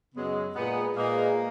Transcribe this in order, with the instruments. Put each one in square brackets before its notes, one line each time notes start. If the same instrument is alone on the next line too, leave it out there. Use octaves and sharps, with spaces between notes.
[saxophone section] F#2 C#3 F#3 B3 [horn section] G#3
[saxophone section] A#2 G#3 D#4 G#4 B4 [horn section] B3
[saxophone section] A#2 G#3 D#4 G#4 B4 [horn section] A#3